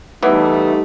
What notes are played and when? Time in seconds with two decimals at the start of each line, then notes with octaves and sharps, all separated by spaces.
0.23 E2 E3 G3 A3 D#4